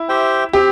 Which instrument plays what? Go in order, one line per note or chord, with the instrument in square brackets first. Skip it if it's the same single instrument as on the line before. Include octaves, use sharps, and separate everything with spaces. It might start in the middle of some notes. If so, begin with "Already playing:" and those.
Already playing: [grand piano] E4
[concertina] G4 C5 E5 G5
[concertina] C4 [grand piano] G4